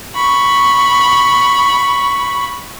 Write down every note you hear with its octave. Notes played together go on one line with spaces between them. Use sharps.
B5 C#6